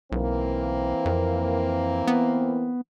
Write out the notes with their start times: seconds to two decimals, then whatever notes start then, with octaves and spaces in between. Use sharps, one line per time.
0.12 B1 E3 A#3 C4
1.05 F2
2.07 B3